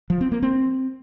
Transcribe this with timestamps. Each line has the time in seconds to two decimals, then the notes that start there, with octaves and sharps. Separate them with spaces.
0.10 F3
0.21 C4
0.32 A#3
0.43 C4